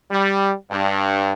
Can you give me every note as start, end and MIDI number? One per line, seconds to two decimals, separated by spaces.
0.11 0.52 55
0.71 1.33 43